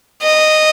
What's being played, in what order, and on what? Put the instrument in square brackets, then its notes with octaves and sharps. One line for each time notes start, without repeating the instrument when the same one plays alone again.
[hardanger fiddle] D#5